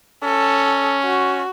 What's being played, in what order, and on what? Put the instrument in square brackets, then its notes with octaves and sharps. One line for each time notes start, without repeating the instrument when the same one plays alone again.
[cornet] C#4 [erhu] A4
[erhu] F#4